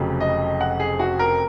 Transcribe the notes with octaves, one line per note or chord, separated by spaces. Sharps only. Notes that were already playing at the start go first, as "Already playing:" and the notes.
Already playing: F1 F2 C#3 F#3
D#5
F#5
G#4
F#4
A#4